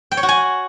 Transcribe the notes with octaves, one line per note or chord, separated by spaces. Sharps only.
G5
C#5
F#4
G#5